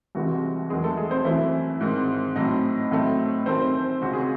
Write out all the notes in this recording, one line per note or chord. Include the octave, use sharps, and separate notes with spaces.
C2 C3 E3 G#3 C4 F#4
E2 D#3 F#3 G#3 G#4
A3 A4
G#3 G#4
C4 C5
F#2 E3 A3 C4 E4 E5
G#2 D#3 G#3 C4
A2 F#3 C4 D#4 D#5
A2 F#3 A3 C4
F#2 D#3 A3 C4 C5
C#2 C#3 G#3 C4 F#4
G#4